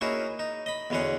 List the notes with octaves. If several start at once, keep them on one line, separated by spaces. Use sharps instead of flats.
A#3 C#4 D#4 E4 F#4 G#4
D#4
D#5 B5
E2 B2 D3 C#4 G#4 F#5